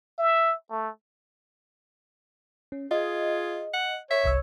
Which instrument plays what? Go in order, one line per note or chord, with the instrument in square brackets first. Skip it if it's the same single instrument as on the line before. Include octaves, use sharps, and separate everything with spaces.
[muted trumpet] E5
A3
[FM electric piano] C#4
[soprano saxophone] F4 [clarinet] G#4 [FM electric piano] D#5
[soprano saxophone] F#5
[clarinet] C#5 [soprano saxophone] E5 [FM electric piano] B6
[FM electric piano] G1 C2 E6